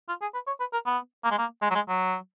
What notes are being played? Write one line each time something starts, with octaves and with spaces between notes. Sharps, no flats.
F4
G#4
B4
C#5
B4
A#4
B3
A#3
G#3
A#3
G#3
F#3
G#3
F#3